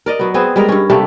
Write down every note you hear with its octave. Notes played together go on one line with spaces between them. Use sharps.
A#4 D5 D#5
F#3 B3
B3 C4 G#4 C5
G3 G#3 A#4
G2 C#4
C3 G3 A3 A#3